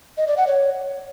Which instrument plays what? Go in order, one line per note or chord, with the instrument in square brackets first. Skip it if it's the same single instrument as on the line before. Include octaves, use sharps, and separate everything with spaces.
[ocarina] D#5
D5
F#5
C#5